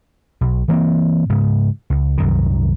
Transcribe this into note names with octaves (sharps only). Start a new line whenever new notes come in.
B1
E3 A#3 C4
G#2 C#3
C#2
C2 F#2 D#3